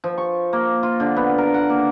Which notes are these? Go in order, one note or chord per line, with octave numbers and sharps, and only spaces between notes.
F3
C#6
A#3
F4
D3
B3
A#4
F#5
A#3